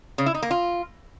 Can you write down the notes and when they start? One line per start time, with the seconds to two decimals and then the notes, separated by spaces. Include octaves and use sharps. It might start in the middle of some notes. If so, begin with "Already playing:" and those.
0.18 C#3
0.26 E4
0.34 D#4
0.42 A#3
0.51 F4